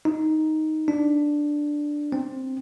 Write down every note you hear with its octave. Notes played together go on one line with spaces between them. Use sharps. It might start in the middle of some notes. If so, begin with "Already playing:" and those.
D#4
D4
C4